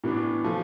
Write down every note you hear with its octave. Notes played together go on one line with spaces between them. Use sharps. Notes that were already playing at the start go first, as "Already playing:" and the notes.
A2 E3 B3 D4
F3 A3